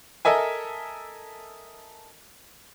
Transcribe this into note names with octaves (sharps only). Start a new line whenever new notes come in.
A4 A#4 D#5 E5 G#5